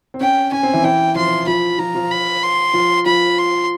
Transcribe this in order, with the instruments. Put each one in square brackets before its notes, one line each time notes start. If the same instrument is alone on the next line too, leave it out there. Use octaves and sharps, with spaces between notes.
[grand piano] C4
[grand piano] C#4 [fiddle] G5
[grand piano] C#4 [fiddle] G#5
[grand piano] C4
E3 E4
[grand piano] E3 E4 [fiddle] G5
[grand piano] F3 F4 [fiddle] C6
[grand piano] F3 F4 [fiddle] B5
[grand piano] F3 F4 [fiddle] A#5
[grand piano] F3 F4
[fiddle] B5
C6
[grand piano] F3 F4
[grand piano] F3 F4 [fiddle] B5
[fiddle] C6